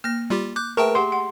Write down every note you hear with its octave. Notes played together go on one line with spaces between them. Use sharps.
A#3 F6 A#6
G3 F4 G4
D6 F#6 G6
A3 G#4 A#4 B4 E5 G5 A5 C#6
G4 F#5 C6 D6
F#5